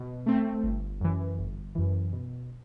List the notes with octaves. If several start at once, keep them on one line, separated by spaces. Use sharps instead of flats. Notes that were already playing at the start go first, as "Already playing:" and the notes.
Already playing: B2
A3 C4
G1
F#2 E3
G1
F#2 E3
B2